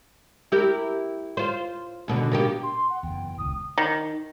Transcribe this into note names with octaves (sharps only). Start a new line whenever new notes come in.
E4 G4 A#4
F4 C5
D#2 B2 D3
B2 A#3 G4
C6
F#5
F#1 E2 G5
D#1 C#2 D#6
D#3